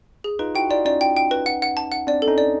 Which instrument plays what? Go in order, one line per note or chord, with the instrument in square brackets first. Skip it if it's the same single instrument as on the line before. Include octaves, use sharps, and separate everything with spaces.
[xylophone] G#4
[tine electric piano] D#4 F4 [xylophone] B4
[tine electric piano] E4 F#4 [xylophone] G5
[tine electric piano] D#4 F4 [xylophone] D5
[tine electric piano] C#4 D#4 [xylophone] D5
[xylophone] G5
G5
B4
F#5
F#5
A5
F#5
[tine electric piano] C4 D4 [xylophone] D5
[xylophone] A4
[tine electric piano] C#4 D#4
[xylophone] D5